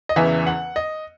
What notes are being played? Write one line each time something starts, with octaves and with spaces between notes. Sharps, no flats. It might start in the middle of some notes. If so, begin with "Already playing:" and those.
D#5
E1 E2 C#3 E3 E5
F#5
D#5